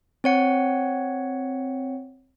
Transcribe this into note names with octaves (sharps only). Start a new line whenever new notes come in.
C4 C#5 F#5